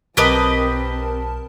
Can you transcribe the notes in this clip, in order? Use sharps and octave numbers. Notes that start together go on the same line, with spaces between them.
B1 C4 G4 A#4 B4 D#5 A5